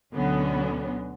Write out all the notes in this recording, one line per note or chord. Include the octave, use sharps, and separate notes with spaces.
D2 B2 D3 F#3 B3 C#4